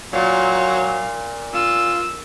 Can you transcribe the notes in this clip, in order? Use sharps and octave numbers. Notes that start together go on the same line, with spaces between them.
A#2 F#3 F5
F4 E6